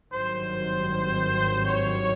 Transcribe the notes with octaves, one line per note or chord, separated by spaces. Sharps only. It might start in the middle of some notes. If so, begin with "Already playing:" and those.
G#1 G2 D#3 F#3 C5
C#5